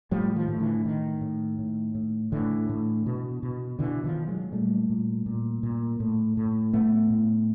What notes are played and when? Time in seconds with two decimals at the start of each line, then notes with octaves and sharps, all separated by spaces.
0.11 A2 F3 G3
0.36 D#3 F3
0.48 A2
0.60 D3 E3
0.85 A2 D#3
1.21 A2
1.59 A2
1.95 A2
2.32 A2 D3 E3
2.69 A2
3.06 B2
3.43 B2
3.79 B2 D3 E3
4.04 D#3 F3
4.16 B2
4.28 F#3 G#3
4.52 A#2 G3 A3
4.90 A#2
5.26 A#2
5.63 A#2
6.00 A2
6.37 A2
6.73 A2 A3 B3
7.10 A2